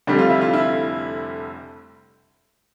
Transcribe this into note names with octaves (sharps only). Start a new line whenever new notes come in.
F1 F2 D3 G3 D4
F4
E4
F4
E4